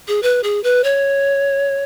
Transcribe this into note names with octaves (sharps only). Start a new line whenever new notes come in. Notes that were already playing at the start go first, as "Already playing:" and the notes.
G#4
B4
G#4
B4
C#5